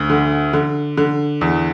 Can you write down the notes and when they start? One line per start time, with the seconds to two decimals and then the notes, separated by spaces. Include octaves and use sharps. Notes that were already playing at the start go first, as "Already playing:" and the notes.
Already playing: D2
0.10 D3
0.53 D3
0.97 D3
1.41 E2